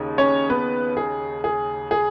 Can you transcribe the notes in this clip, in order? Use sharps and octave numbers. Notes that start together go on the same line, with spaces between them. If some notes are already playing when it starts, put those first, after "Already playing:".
Already playing: D#2 C#3 D#4
C#4 C#5
B3 B4
G#4
G#4
G#4